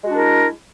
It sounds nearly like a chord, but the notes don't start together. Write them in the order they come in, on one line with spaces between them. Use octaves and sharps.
G#3 F#4 D4 E4 A#4